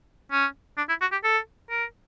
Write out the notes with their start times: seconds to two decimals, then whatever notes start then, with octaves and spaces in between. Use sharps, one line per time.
0.32 C#4
0.77 D4
0.89 E4
1.01 F#4
1.12 G4
1.24 A4
1.70 A#4